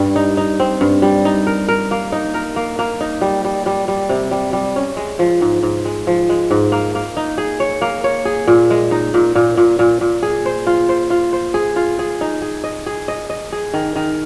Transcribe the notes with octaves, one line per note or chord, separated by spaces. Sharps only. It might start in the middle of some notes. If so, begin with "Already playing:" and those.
Already playing: G2 G3
D#4
D#4
C4
G2
G3
D#4
A#4
A#4
A#3
D#4
A#4
A#3
A#3
D#4
G3
G3
G3
G3
C3
G3
G3
C#4
G#3
F3
G#2
G#2
G#3
F3
G#3
G#2
A#3
A#3
D#4
G#4
C#5
A#3
C#5
G#4
A#2
G#3
D#4
A#2
A#2
A#2
A#2
A#2
G#4
C5
F4
C5
F4
C5
G#4
F4
G#4
D#4
G#4
D#5
G#4
D#5
D#5
G#4
D#3
D#3